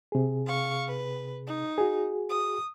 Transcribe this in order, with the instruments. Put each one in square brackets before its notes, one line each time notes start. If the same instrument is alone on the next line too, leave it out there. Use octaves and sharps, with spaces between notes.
[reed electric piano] C3 G#4
[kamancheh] F5 C#6
B4
D#4
[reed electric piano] F#4 G#4
[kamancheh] D#6